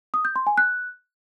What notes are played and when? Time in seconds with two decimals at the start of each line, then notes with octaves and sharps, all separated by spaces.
0.14 D#6
0.25 G6
0.36 C6
0.47 G#5
0.58 F#6